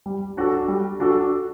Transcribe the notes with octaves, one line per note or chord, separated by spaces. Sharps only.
G3
D4 F#4 A4
G3
D4 F#4 A4